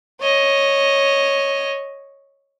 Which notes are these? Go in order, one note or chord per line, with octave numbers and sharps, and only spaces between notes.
C#5 D#5